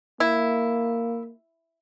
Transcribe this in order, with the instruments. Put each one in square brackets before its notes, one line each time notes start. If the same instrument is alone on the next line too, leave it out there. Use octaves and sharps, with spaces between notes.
[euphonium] A#3 [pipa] E4